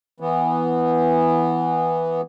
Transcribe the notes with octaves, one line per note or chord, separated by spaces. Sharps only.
E3 B3